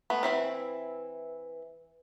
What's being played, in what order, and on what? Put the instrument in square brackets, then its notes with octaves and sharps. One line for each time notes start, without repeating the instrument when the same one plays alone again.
[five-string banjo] A3 B3 [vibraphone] B4
[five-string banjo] E3 C4 E4